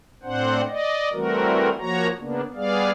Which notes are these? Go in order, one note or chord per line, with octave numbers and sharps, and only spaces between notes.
A2 C4 D4 C5 F#5
D5 D#5
E3 G3 A3 C4 F#4 A#4
F3 A#3 F#4 C#5 A#5
C#3 A#3 B3 D4
G3 B3 G#4 D5 F5